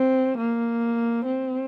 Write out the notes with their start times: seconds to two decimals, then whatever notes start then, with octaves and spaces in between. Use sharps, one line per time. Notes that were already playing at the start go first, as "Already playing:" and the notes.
Already playing: C4
0.38 A#3
1.26 C4